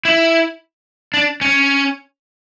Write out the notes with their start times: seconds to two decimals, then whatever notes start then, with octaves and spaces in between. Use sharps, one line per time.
0.05 E4
1.14 D4
1.41 C#4